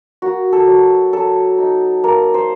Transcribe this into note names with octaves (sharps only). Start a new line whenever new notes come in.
A#3 F#4
A4
F#3
F#3 A4
D#4
A#3 A#4
C5